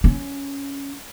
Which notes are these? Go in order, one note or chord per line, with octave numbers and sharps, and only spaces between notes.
C#4